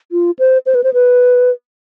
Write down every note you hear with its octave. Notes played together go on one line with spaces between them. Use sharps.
F4
C5
C5
B4
C5
B4